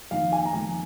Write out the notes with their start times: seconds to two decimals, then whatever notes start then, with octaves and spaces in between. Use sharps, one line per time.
0.11 F2 D#3 A#3 F5
0.32 G#5
0.45 A#5
0.53 F2 D#3 A#3 G#5